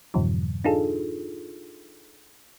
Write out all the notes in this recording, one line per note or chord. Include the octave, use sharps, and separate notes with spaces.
F2 G#2 B2 D3 E3 F#3
D4 D#4 F4 G#4 A4